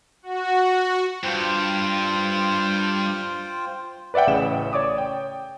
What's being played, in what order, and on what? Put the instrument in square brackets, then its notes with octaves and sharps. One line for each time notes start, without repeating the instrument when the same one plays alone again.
[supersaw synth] F#4
[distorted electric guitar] G2 [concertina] F4 C5 G5
[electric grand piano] B4 D5 E5 F#5 G5
A1 C#3 E7
C#5 D5 D6 D#6
G5